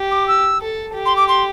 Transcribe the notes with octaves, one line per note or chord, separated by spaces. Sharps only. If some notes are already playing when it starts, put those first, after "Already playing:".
Already playing: G4
D6
E6
A4
G4
C6
D6
C6